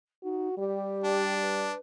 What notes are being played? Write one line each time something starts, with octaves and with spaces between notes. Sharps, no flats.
D#4 F#4
G3 G4
D4
B4